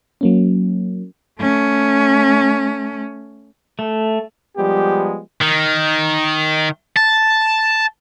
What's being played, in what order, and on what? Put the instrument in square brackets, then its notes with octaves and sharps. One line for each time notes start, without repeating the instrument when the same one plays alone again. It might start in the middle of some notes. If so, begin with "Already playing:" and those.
[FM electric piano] F#3 A#3 C#4
[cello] A3 C#4
[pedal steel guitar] A3
[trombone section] F3 G3 G#3 B3 G4
[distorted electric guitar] D#3
A5